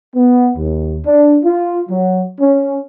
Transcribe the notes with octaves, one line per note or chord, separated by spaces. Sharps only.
B3
D#2
D4
F4
F#3
C#4